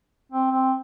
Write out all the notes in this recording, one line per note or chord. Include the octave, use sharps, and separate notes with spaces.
C4
C4